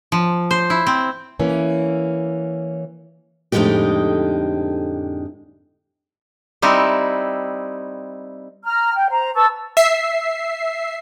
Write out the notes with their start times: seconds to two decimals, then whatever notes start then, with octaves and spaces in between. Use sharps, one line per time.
0.12 F3
0.51 C5
0.70 E4
0.87 C4
1.40 E3 A#3 C#4
3.52 F2 A2 D3 G#3 D#4 G4
6.62 G3 C4 D#4 E4
8.65 A#5 F6
8.94 G5
9.10 C5 A#5
9.35 B4 A5 C#6 E6
9.77 E5 C7